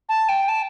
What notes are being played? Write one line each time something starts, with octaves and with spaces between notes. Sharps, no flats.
A5
G5
A5